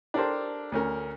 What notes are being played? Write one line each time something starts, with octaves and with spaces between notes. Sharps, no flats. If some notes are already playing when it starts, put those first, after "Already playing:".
D4 G4 A4 A#4 C5
D2 C#4 A#4